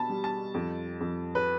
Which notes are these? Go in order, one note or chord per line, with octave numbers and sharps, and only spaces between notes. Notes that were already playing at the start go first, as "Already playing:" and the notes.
Already playing: B2 A5 B5
G3
A5
F2
F2
B4